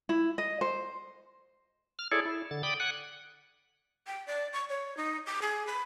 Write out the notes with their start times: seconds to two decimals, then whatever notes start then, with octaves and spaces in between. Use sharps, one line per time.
0.09 E4
0.38 D#5
0.61 C5
1.99 F6
2.12 E4 G#4 A4 C#5 D5
2.25 E4
2.51 D3 A6
2.63 D5 G5 B5 D6 D#6
2.80 F#5 G#5 F#6
4.07 G5
4.27 D5
4.53 C#6
4.69 C#5
4.97 D#4
5.26 D6
5.42 G#4
5.67 B5